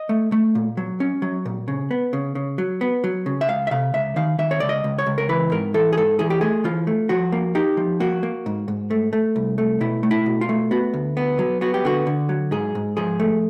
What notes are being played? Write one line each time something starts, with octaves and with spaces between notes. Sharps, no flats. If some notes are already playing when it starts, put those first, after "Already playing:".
Already playing: D#5
A3
A3
A#2
F#3
C#4
F#3
A#2
C#3
B3
C#3
C#3
F#3
B3
F#3
C#3
E5
C#2 F5
E5
C3 F5
C#2 E5
D#3 F5
D#3 E5
C#5
C#2 D5
D#5
C#2
C#5
C#2
A#4
E3 B4
G#2 A#4
E3 A4
G#4
G#2 A4
E3 G#4
G4
A3 G#4
E3 F4
A3
F3 F#4
A#3
D#4 G4
F3
A#3 F#4
A#3
G#2
G#2
A3
A3
C2
A3
B2 E4
A3
E4
B2
F4
A3
B3 F#4
D2
B3
F#3
B3 F#4
G4
D3 F#4
D3
F#3
G#2 G#4
G#2
F3 G#4
A3